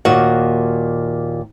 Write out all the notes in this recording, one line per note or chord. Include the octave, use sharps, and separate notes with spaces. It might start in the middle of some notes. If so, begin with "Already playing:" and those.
D#2 A#2 F#4 F#5